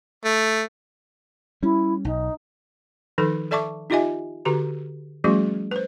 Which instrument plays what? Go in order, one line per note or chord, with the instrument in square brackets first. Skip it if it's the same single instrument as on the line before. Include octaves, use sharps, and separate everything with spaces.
[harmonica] A3
[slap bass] G3 C#4 [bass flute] E4
[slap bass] B1 [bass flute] D#4
[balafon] D#3 F3 D#4 A4 B4
A4 D5 E5 A5 C#6 D6
D#4 F4 G4 D#5 E5 G#5
D3 F#4 G4 B4 A#5
F3 G3 A3 C#4 F#4 G#4
B4 C5